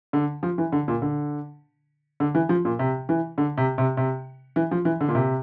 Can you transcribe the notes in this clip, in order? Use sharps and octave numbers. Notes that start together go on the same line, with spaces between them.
D3
F3
E3
D3
A#2
D3
D3
E3
F3
A#2
C3
E3
D3
C3
C3
C3
E3
F3
E3
D3
A#2
C3